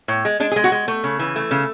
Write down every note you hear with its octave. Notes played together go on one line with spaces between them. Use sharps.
A2
G#3
G#3 D4
G#4
G#3
F#4
G#3
A3
C#3
E3
A3
C#3